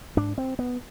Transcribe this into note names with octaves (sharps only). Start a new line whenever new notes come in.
G#2 D4
C4
B3